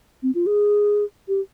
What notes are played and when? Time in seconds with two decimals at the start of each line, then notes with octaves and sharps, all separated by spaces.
0.23 C4
0.35 F4
0.46 G#4
1.28 G4